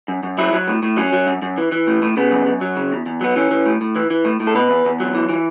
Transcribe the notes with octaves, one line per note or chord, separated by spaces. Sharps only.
F#2
F#2
F#3 E4
F#3
A2
A2
F#3 C#4
F#3
F#2
F#2
E3
E3
A2
A2
C#3 B3
F#2
F#2
F#3
C#3
E2
E2
F#3 B3
E3 C#4
E3
A2
A2
E3
E3
A2
A2
A4
B2 B4
E2
E2
F#3
E3
E3